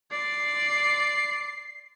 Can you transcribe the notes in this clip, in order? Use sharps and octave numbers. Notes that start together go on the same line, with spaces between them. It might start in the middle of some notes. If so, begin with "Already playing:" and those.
D5 C6 C7